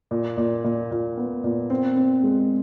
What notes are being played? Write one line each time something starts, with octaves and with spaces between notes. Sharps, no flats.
A#2
A#2
A#2
A#2
B3
A#2
C4
C4
G#3